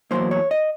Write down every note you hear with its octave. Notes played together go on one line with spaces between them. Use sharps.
E2 B2 F#3 A#3 C5
C#5
D#5